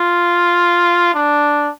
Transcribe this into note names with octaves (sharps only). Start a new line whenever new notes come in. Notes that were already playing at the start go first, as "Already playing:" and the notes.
Already playing: F4
D4